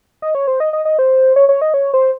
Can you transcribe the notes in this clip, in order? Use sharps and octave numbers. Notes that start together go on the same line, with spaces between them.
D#5
C#5
C5
D#5
D#5
D#5
C5
C#5
C#5
D#5
C#5
C5